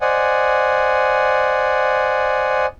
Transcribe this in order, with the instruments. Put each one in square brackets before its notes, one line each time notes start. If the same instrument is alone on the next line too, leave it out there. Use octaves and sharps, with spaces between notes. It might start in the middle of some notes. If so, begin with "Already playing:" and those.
[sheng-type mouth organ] C5 D5 D#5 F#5 G#5